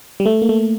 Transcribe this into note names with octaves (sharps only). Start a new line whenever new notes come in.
G3
A3
A#3
A3